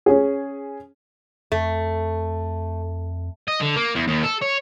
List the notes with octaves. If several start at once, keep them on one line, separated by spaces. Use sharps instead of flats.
C#4 G#4
F2 A3
D#5
D3
A#3
E2
D#2
A4
C#5